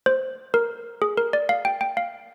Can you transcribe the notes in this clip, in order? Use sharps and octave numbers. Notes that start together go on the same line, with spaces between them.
C5
A#4
G#4
A#4
D5
F5
G5
G5
F5